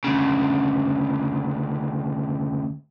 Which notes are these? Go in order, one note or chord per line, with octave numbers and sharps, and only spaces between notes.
D2 C#3